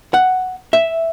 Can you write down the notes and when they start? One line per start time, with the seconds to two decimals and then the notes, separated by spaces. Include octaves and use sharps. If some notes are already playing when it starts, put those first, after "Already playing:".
0.14 F#5
0.73 E5